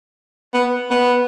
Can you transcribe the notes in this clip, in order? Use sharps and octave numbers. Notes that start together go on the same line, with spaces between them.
B3
B3